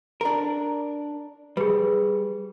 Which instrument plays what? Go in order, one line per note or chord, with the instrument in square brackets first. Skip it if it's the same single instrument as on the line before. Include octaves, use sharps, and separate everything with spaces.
[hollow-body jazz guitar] D4 A#4
[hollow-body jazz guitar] G3 [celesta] G#4 B4